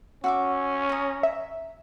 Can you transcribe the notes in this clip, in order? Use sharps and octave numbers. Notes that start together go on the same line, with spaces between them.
C#4 F#4 E5 D6
A#5 D#6
E5